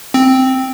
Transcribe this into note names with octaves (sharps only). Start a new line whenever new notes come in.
C4